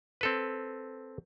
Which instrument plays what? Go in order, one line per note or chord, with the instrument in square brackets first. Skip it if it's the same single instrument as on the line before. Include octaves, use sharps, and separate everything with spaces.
[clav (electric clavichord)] C4 A4 B4